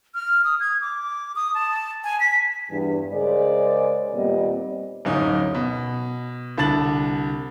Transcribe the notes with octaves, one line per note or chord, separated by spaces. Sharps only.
F6
D#6
G#6
D6
D#6
A5
G#5
B6
E2 G2
C#3 G#3 A#4 C5 D5
D#2 A#2 G3 B3 C4 D#5
D1 F#2 C#4 D#4
B2
C2 D3 A5 A6 F#7